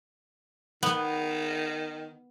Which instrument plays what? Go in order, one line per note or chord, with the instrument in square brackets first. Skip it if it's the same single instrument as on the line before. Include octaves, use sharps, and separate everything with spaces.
[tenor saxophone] D#3 [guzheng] B3